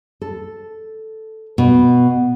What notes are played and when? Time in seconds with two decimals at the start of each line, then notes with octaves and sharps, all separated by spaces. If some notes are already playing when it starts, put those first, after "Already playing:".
0.21 A4
1.58 B2